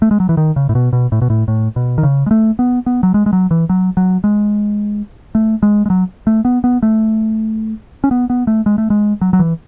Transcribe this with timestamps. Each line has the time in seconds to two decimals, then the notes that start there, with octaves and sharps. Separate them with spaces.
0.02 A3
0.11 G#3
0.20 F#3
0.29 E3
0.37 D#3
0.56 C#3
0.69 A2
0.75 B2
0.93 B2
1.12 A2
1.22 B2
1.30 A2
1.48 A2
1.76 B2
1.98 D#3
2.03 C#3
2.26 G#3
2.31 A3
2.59 B3
2.86 B3
3.03 F#3
3.14 G#3
3.26 G#3
3.33 F#3
3.51 E3
3.69 F#3
3.97 F#3
4.24 G#3
5.35 A3
5.63 G#3
5.86 G#3
5.90 F#3
6.27 A3
6.45 B3
6.64 B3
6.83 A3
8.04 C#4
8.11 B3
8.30 B3
8.47 A3
8.66 G#3
8.78 A3
8.90 G#3
9.21 F#3
9.33 F#3
9.39 E3